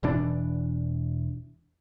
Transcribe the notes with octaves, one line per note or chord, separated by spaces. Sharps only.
E1 B2 E3 D4